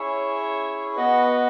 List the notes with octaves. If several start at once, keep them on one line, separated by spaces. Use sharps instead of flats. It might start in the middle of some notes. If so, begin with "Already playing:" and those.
Already playing: C#4 E4 G#4 C#5 E5
B3 F#4 B4 D#5